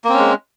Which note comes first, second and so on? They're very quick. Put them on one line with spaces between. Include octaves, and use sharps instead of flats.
A#3 C4 C#4 G#3